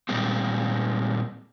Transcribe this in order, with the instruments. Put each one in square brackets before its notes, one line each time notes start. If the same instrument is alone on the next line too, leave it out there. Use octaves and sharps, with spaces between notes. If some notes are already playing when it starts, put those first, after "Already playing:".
[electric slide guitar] A#2 G3 G#3 A#3 C4